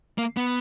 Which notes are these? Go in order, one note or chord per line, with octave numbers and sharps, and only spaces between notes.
A#3
B3